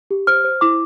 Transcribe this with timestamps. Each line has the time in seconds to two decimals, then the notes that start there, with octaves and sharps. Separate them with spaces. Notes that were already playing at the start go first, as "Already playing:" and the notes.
0.11 G4
0.27 C5 F6
0.44 C5
0.61 E4 D6